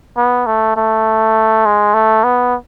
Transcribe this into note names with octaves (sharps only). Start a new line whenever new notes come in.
B3
A3
A3
G#3
A3
B3